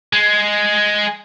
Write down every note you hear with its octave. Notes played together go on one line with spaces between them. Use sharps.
G#3